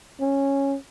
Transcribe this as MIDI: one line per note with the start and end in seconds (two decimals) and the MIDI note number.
0.20 0.75 61